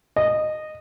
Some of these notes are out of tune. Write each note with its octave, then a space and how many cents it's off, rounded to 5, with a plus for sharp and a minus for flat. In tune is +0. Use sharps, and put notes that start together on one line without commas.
D#5 -15